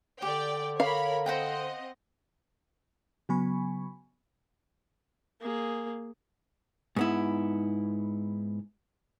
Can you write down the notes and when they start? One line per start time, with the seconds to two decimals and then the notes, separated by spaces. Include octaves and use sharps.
0.22 D3 G4 D5 G5
0.80 A#4 C#5 F5 B5
1.26 C4 C5 D#5 F#5 G5
3.29 C#3 F#3 B3 G#5 B5 C#6
5.41 A#3 G#4
6.96 G#2 B3 E4